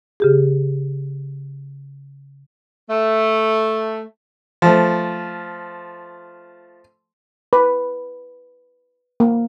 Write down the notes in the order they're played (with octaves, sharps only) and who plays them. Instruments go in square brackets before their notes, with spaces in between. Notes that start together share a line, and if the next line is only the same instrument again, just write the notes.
[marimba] C#3 G4 G#4
[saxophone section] A3
[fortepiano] F3 A3
[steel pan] B4
A#3